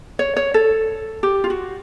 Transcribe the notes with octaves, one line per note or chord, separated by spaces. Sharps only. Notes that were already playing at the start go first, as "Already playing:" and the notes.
C#5
C#5
A4
G4
F4
F#4